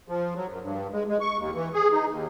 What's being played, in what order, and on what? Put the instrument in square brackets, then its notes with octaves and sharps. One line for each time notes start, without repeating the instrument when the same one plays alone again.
[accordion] F3
F#3
F#2
G2
G#3
G#3
C#6
D#2
E3
G#4
D#4
D#2